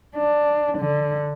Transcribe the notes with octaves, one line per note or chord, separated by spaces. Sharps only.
D4
D3